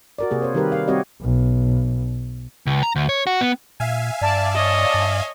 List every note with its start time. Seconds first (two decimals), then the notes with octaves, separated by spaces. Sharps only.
0.19 F#4 A#4 D5
0.31 C3 A#3 G#4
0.42 C5 C#5
0.55 D#3 G3 G4 A#4 B4
0.72 F5
0.88 G3 C4 F#4 G4 C#5 D#5
1.21 B1
2.67 C#2
2.83 A#5
2.96 D2
3.09 C#5
3.27 F#4
3.41 B3
3.80 A#2 E5 F5 G#5
4.21 G2 D5 A5
4.55 C#5 D#5
4.94 G2